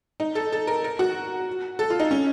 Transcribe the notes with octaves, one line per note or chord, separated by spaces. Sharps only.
D#4
A4
A4
A#4
A#4
F#4
A4
F4
D#4
C#4